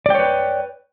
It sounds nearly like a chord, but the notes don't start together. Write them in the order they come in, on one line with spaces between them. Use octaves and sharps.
D5 G5 C#5 B4